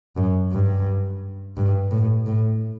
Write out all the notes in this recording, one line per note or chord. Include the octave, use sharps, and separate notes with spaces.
F#2
G2
G2
A2
A2